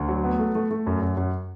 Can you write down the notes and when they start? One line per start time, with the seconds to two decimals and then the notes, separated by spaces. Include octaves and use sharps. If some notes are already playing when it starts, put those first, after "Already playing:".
Already playing: D2
0.09 F#3
0.24 B3
0.39 A3
0.55 A3
0.71 A3
0.86 F#2
1.02 F#2
1.17 F#2